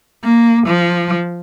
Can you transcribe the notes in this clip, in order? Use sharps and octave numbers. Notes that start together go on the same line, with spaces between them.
A#3
F3